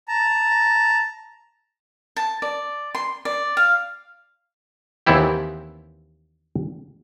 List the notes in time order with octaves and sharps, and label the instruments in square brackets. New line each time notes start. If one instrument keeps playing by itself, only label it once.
[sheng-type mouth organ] A5 A#5
[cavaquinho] A5
D5
C6
D5
F5
[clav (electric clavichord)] D#2 E3 B3 C4 E4 G4